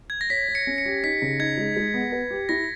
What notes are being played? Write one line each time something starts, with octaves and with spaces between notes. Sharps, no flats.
G#6
A#6
C#5 B6
C#5
C#7
C#4
C#7
G4
D#4 B6
C#3
D#4 G#6
G#3
G#3
B3
B4
G4
E4 A#6